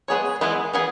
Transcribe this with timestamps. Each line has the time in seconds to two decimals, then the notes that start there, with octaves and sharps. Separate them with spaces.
0.08 G#3 B3 G#4 C#5
0.41 E3 G#3 B3 E4
0.74 E3 B3 G#4